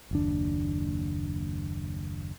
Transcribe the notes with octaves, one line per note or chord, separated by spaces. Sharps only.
F#1 D#2 D4